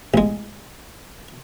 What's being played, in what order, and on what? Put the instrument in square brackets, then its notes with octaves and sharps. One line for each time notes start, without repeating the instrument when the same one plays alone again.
[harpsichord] A1 G#3